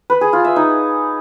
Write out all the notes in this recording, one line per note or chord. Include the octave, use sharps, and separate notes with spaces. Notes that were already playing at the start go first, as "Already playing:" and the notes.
B4
G#4
F4
E5
D#4